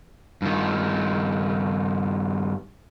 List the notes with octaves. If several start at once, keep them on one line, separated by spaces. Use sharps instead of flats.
G2 D#3